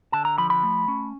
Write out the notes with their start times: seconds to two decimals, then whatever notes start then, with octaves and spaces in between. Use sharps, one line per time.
0.12 D3 A5
0.25 A#5
0.38 F3 B5
0.50 B5
0.63 A3
0.88 C#4